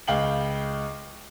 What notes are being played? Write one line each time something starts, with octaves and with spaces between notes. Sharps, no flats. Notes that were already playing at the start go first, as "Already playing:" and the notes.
C#2 F5 G5 F#7